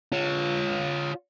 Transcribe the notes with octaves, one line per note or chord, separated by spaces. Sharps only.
F4 C#5